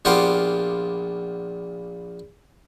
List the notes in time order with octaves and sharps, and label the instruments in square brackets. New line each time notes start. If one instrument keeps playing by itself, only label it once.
[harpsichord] A#1 A#2 B3 F4 G4 C5